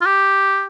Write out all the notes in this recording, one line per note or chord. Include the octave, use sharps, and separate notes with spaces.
F4
G4